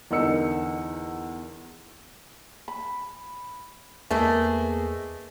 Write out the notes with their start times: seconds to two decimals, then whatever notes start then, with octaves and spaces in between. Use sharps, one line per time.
0.11 E2 D3 D#4 A#4 E6 C#7
2.68 B5
4.10 E2 A3 A#3 G#4 B4 D#5